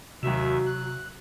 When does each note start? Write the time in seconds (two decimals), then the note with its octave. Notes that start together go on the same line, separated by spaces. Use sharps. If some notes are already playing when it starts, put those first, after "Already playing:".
0.23 D#2 C3 F#3 F#4 E5 E7
0.66 F#6